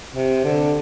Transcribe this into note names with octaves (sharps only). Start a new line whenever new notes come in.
C3
D3